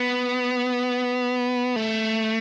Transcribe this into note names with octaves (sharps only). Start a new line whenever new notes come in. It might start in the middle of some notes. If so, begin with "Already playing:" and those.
Already playing: B3
A3